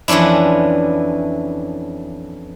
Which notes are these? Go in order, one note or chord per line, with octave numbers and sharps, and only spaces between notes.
F2 E3 C#4 D4 E4